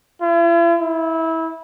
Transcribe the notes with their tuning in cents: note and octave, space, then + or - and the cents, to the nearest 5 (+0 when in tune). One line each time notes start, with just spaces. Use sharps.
E4 +45
E4 -20